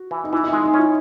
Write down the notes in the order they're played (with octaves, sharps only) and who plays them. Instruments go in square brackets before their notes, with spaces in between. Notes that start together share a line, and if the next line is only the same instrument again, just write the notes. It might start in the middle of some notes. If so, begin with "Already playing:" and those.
Already playing: [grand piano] F#4
[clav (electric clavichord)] E3
[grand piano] D#4
[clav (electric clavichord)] E3 [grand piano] E4
[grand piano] D#4
[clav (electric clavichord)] G#3 [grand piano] E4
[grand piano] D#4
[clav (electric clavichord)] C#4 [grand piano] E4